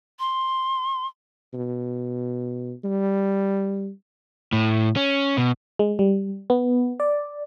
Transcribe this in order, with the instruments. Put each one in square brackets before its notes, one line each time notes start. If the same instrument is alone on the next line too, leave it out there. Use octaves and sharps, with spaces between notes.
[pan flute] C6
[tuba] B2
G3
[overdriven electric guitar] A2
C#4
B2
[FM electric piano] G#3
G3
B3
D5